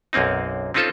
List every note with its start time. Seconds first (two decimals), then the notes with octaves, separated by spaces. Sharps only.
0.13 B1 F#2 A#3 C4 D#4
0.74 C4 C#4 D#4 F4 A4 C5